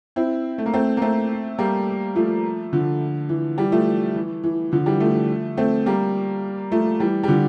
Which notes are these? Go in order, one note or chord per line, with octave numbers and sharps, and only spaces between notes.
C4 E4
A3
A#3
A3 C4
A#3
A3 C4
G3 A#3
F3 A3
D3 F3
E3
E3 G3
F3 A3
E3
E3
D3 F3
E3 G3
F3 A3
A3 C4
G3 A#3
F3 A3
E3 G3
G3
D3 F3